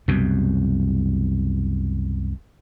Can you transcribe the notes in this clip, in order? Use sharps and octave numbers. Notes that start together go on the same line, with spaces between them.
C2 F#2 B2